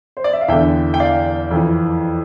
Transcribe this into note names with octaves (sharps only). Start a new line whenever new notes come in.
C5
D5
E5
F5
E2 D3 E5 G5
G5
D5 F5
F2
E3